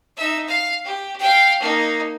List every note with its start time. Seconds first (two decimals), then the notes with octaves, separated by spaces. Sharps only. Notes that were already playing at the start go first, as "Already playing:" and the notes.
0.17 D#4 E5
0.48 F5
0.85 G4
1.19 F5 G5
1.61 A#3 D#4